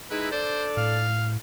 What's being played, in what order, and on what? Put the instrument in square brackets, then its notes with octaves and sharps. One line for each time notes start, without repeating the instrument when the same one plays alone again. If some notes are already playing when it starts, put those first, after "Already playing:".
[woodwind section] G#3 D#4 E4 [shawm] B4
[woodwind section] D4 A4 D5 [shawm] C5
[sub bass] A2 [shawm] F5